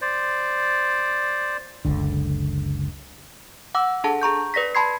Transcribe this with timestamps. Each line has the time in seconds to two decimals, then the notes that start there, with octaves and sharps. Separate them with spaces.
0.01 C5 D5
1.85 F#1 C#2 D3
3.75 F#5 D6 E6
4.04 D4 G#4 A4 F#5 A5
4.22 G#4 A#5 C#6 G6
4.54 B4 D5 A#6 B6
4.75 A5 B5 C6 G#6 C7